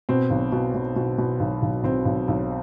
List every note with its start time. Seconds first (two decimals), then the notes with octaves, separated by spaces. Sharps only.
0.09 B2 C4
0.30 B1
0.52 B2
0.74 B2
0.96 B2
1.18 B2
1.40 B1
1.62 B1
1.84 B1 C4
2.05 B1
2.28 B1